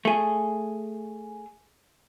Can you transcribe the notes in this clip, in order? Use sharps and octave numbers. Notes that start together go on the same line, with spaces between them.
A3 G#4